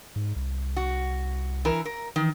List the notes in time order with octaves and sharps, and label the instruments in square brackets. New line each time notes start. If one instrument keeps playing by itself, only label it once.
[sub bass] G#2
C2
[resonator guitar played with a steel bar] F#4
E3 A#4
A#4
[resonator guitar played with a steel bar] D#3 [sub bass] E3